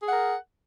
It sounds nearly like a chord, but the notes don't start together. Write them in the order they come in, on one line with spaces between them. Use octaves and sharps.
G#4 F#5 A#4